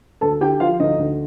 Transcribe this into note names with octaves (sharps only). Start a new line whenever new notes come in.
D2 A4 A5
D3 G4 G5
F3 F4 F5
D2 D#4 D#5
D2